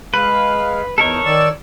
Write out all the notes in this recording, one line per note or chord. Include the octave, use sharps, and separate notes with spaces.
G#3 B4 F5
E2 D#4 A4 A#4 C#5
D#3 D5 E6